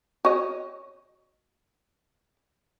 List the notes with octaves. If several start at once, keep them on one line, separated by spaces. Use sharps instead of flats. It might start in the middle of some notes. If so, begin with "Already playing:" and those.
F#4 C#5 D#5